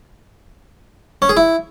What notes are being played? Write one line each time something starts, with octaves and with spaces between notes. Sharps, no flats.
C#4
G#4
E4